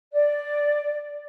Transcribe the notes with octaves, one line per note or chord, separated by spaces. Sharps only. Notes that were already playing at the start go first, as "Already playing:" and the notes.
D5